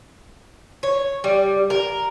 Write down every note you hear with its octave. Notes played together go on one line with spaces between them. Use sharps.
C#5
G3
A#4